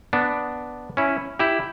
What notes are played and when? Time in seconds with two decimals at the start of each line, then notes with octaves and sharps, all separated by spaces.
0.13 B3 D4
0.97 C#4 E4
1.39 E4 G4